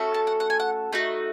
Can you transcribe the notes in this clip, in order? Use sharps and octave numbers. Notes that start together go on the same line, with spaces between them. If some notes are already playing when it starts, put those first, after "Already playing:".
Already playing: A3 C#4 F#4 A4
A5
F#5
F#5
G#5
F#5
A3 D#4 F#4